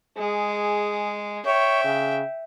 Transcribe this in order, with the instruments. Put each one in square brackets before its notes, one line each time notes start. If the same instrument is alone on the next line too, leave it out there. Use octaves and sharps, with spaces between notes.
[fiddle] G#3 [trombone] G#4
[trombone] C#5 [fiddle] E5 G5
[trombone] C#3